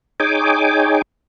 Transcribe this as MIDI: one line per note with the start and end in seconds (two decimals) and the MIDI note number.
0.20 1.02 63
0.20 1.02 68
0.20 1.02 73
0.20 1.02 79
0.20 1.02 80
0.20 1.02 86